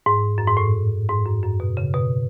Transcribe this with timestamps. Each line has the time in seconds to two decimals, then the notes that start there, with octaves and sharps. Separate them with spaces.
0.06 G#2
0.38 F#2
0.47 G#2
0.57 A2
1.09 G#2
1.26 F#2
1.43 F#2
1.60 B2
1.77 C#3
1.94 B2